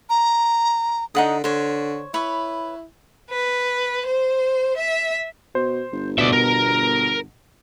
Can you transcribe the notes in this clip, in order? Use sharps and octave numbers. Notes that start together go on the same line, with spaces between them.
A#5
D3 D#4 F#5 D#6
D3 C5 C#5
E4 B4 C#5 B5
B4
C5
E5
B2 C5
G1
B2 D5 E5
A#4